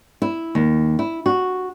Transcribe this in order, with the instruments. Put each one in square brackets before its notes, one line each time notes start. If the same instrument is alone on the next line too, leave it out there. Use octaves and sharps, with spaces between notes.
[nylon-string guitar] E4
D#2
E4
F#4